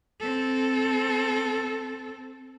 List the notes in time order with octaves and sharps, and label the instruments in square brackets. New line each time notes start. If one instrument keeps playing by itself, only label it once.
[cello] C4 A4